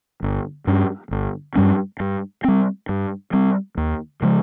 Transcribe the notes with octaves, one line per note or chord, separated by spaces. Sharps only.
G1
G2 G3 C#4
G1
G2 G3 C#4
G2
G3 C4
G2
G3 C4
D#2
C#3 F3 G#3